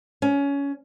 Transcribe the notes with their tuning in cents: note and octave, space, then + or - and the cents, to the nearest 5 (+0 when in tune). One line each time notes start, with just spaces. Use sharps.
C#4 +20